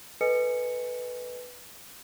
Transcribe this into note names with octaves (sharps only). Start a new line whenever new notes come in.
A4 B4 D#5 G#5 C#7